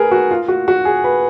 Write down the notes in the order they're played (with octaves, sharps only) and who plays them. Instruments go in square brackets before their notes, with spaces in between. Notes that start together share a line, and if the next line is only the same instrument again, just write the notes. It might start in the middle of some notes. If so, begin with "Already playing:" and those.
Already playing: [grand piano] G#4 A#4 B4
F#4
F4
F#4
F#4
G#4
B4